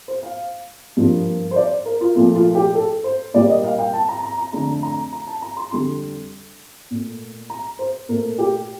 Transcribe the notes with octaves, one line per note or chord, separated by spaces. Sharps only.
C5
F5
G2 F3 A#3
C5
D5
A#4
F4
A#2 F3 A3 F4
F4
G4
A4
C5
A#2 G3 A#3 D5
D#5
F5
G5
A5
A#5
A#5
A#5
F2 D3 A3 A#5
A#5
A#5
A5
A#5
C6
F2 D3 G3 C6
A#2 A3
A#5
C5
A#2 A3 A#4
G4